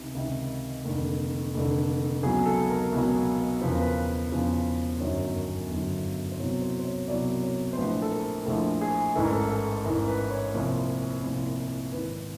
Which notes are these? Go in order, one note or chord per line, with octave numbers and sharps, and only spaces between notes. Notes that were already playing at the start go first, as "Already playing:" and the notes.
Already playing: C#2 C3 D#3 D#4
C#2 C3 D#3
F1 D#2 D3
F1 D#2 D3
C#2 B2 F#3 G#4
A4
A#4
C#2 B2 F#3
E1 E2 C#3 F3 B4
A#4
B4
E1 E2 C#3 F3
G1 F#2 D#3 F#3 C#5
G1 F#2 D#3 F#3
C5
C2 B2 F#3 C#5
C5
C5
C#5
C2 B2 F#3 D5
C#5
C5
A#1 A2 F3 B4
A4
A#4
A#1 A2 F3 A4
G#4
A1 G#2 E3 A4
A#4
A4
A4
A1 G#2 E3 A#4
B4
C#5
C2 A#2 F3
C2 A#2 F3
G#1 G#2 E3 B4